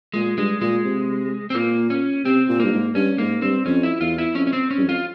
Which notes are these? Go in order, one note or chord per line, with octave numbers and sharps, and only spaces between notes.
A#2 G#3
G2 G#3
A#2 G#3
C3
C4
A#2 A#3
C#4
C3 C4
A#2
G2 A#3
G#2
G2 C#4
G#2 A#3
G2 C4
F2 C#4
E4
E2 F4
E4
F2 C#4
C#4
C4
C#4
G2
F2
F4